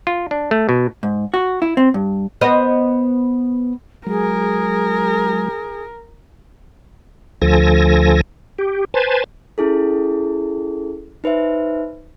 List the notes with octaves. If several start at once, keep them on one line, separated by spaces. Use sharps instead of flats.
F4
D4
A3
B2
G#2
F#4
E4
C4
G2
B3 C5 D#5
F#3 G#3 G#4 A#4
D2 F3 A4 G#5 A#6
G4
B4 C5 G#5 A5
C#4 E4 G#4 A4
D#4 B4 C5 E5